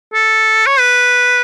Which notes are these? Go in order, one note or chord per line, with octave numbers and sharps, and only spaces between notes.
A4
C#5
B4